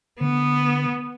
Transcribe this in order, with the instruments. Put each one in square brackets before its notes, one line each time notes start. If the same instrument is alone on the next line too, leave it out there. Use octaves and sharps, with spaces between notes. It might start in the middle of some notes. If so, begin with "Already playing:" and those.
[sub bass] D3 [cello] B3